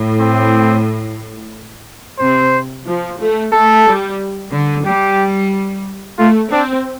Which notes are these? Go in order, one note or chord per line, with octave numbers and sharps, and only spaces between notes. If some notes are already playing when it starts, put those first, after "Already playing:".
Already playing: A2
C4
C3 C5
F3
A3
A3 A4
G3
D3
G3 G4
A3 F4
C4 D4